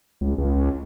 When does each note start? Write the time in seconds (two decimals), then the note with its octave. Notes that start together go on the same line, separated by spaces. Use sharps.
0.21 C#2
0.38 C#2